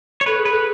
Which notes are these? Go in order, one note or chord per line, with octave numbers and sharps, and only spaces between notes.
C#5
A4 B4
G#4
B4
A4